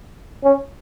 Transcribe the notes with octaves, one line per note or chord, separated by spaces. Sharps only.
C#4